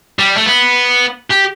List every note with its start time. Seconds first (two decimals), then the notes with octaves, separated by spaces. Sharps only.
0.19 G3
0.37 A3
0.46 B3
1.30 G4